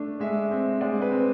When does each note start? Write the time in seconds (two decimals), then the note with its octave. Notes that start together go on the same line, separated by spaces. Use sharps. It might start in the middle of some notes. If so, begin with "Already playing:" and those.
Already playing: A3 D4
0.20 G#3 E5
0.51 C4
0.81 G#3 D5
1.02 B4
1.11 C4